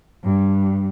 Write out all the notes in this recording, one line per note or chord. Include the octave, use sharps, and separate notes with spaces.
G2